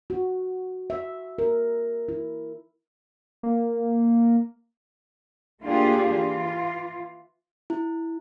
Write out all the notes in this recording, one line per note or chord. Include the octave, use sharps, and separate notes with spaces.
F#4
E5
A#4
E4
A#3
A3 A#3 D4 F4 G4 G#4
E3 F4
E4